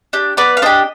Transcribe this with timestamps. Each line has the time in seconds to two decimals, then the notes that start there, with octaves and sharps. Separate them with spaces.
0.13 D4 G4
0.37 B3 B4 D5
0.57 F5
0.62 D4 G4 C5 D#5